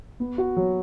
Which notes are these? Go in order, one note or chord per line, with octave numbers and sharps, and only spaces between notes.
B3
F#4
F#3